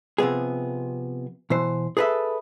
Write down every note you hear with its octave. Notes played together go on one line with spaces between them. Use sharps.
C3 F3 B3 G#4
B2 E3 C5
G#4 A4 B4 D#5 E5